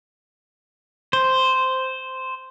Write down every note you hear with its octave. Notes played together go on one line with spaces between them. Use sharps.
C5